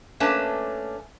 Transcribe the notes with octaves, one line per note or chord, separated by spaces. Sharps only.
A3 A#3 C#4 D4 B4 A5